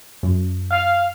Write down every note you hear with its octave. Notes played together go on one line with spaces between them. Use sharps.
F#2
F5